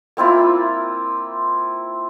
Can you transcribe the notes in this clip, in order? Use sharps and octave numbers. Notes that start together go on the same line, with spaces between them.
A#3 C4 E4 F4